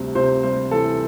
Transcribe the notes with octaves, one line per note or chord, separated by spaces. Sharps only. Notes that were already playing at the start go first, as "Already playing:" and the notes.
Already playing: D2 C3 G3
C3 C5
G3 C5
E3 A4